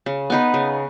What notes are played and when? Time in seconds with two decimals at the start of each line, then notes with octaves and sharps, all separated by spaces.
0.06 C#3
0.30 B3 D#4 B4
0.54 C#3